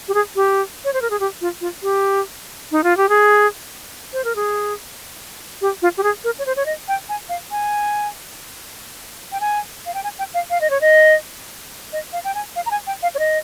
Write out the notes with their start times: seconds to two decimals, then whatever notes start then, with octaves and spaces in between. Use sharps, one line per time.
0.08 G4
0.14 G#4
0.36 G4
0.85 C#5
0.93 C5
1.02 A#4
1.10 G#4
1.20 G4
1.41 F4
1.61 F4
1.83 G4
2.72 D#4
2.84 F4
2.97 G4
3.09 G#4
4.13 C5
4.25 A#4
4.36 G#4
5.61 G4
5.82 F4
5.97 G4
6.03 G#4
6.24 A#4
6.39 C#5
6.46 C5
6.56 C#5
6.66 D#5
6.88 G5
7.09 G#5
7.29 F5
7.51 G#5
9.32 G5
9.41 G#5
9.86 F5
9.94 G5
10.04 G#5
10.19 G5
10.34 F5
10.50 F5
10.61 D#5
10.70 C#5
10.81 D#5
11.93 D#5
12.13 F5
12.24 G5
12.35 G#5
12.56 F5
12.66 A#5
12.71 G#5
12.87 G5
13.03 F5
13.15 C#5
13.19 D#5